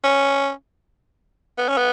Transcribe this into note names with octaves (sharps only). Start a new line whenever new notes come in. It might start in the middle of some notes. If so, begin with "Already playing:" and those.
C#4
B3
C#4
B3